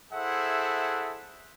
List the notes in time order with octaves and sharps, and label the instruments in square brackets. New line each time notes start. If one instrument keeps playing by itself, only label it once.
[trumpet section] E4 G#4 A4 C5 E5 F#5